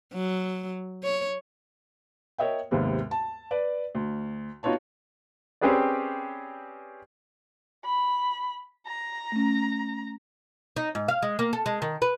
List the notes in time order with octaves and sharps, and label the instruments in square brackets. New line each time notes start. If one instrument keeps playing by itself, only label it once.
[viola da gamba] F#3
C#5
[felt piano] A#4 C#5 D#5 E5 G5
D#2 G#2 C3 B3
A5
B4 D5
D2
B3 D#4 F4 F#4 C#5 A5
[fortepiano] C4 C#4 G4 G#4 B4 D5
[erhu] B5
A#5
[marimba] A3 C#4
[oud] D#4
G#2
F5
G#3
A#3
A4
G#3
D#3
B4